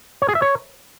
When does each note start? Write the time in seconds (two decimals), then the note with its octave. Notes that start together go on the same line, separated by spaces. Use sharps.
0.22 C#5
0.28 G#4
0.35 E5
0.42 C#5